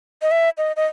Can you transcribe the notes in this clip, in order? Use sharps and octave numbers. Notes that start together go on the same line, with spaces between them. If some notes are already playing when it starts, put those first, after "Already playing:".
D#5
E5
D#5
D#5